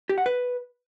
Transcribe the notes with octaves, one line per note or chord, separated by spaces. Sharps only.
G4
F#5
B4